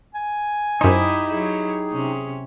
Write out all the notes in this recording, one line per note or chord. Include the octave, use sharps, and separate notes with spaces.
G#5
F#2 D#4 E4 G4 C5 D#5
F#3 E4 G#4
C3 C#4